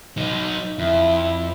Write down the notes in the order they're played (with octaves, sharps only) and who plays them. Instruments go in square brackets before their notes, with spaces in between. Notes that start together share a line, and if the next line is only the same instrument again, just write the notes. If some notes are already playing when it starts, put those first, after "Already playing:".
[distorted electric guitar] F#3 D#4
[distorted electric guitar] F2 [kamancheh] E4